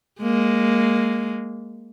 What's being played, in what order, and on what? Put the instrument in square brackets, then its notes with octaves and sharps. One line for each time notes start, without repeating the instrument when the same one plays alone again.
[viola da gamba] G#3 A#3